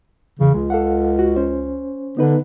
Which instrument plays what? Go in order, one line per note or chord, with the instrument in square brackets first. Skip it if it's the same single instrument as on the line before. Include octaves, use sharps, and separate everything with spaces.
[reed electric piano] E2 E3 [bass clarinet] C#3
[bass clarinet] C#2 [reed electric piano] G#3
[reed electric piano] A4 F5 F#5
F#4
C#4 C5
[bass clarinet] D3 [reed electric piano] B3 D#4 B4